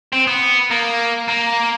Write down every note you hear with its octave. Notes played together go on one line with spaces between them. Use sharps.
C4
B3
A#3
A#3